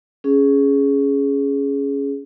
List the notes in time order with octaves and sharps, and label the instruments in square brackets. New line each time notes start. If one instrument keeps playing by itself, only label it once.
[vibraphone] C#4 G#4